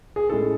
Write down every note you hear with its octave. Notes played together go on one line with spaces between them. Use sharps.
G#4
A2 G#3 C#4 E4 A4